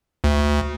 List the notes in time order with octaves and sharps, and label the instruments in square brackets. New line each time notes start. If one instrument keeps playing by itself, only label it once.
[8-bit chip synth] D2